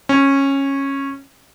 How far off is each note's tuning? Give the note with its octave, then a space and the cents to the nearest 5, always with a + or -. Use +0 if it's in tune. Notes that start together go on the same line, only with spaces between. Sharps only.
C#4 -15